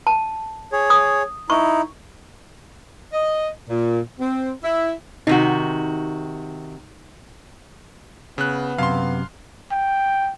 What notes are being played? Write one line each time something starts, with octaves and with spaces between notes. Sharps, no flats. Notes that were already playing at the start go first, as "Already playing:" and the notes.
A5
G#4 C#5
D#6
D#4 E4 C#6
D#5
A#2
C4
E4
C3 D#3 D#4 F#4
C#3 B3 F#6
F#2 C3 F5 C6
G5